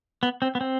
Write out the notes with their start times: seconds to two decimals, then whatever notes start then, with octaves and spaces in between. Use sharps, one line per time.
0.23 B3
0.42 C4
0.55 B3
0.61 C4